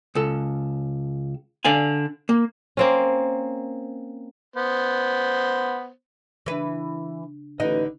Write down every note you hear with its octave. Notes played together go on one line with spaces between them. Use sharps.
C#2 A4
D3 D5 F5 G#5
A#3
A#3 C4 C#4
B3 C5
C#3 E3 D4 B4
A1 D3 D#4 B4 D#5